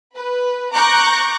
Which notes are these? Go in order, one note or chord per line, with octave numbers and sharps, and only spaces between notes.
B4
A#5 C#6 D6 F#6 G6 A#6